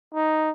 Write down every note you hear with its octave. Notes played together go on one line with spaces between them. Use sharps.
D#4